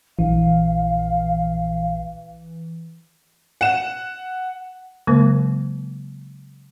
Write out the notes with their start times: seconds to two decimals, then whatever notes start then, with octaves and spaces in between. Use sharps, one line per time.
0.19 A#1 E3 F5
3.61 F#5 E7
5.07 C#3 F#3 G#3 A#3 A#4